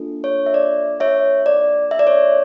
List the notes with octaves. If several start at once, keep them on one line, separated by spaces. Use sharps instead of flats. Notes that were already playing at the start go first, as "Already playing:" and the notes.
Already playing: A#3 D4 F4 A4
C#5
E5
D5
C#5 E5
D5
E5
D5
C#5